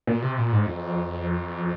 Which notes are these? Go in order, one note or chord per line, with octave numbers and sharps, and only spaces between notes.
A#2
C3
A#2
G#2
F2